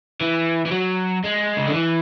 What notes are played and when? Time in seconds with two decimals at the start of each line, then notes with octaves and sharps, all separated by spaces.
0.21 E3
0.66 E3
0.71 F#3
1.24 G#3
1.57 C#3
1.66 D3
1.74 E3